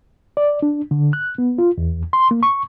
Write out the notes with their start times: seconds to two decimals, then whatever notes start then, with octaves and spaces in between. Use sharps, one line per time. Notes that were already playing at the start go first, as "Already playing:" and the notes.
0.37 D5
0.62 D4
0.91 D3
1.13 F#6
1.38 B3
1.58 F4
1.78 E2
2.13 C6
2.31 A#3
2.43 C#6